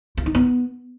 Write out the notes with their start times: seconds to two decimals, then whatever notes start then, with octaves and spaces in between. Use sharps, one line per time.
0.17 F4
0.26 D#4
0.35 B3